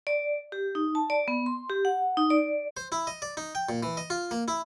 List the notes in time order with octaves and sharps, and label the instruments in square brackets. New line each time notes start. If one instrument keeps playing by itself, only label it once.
[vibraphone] D5
G4
D#4
A5
D5
B3
C6
G4
F#5
D#4
D5
[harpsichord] C5
E4
D#5
D5
D#4
G5
A#2
E3
D#5
F4
A#3
E4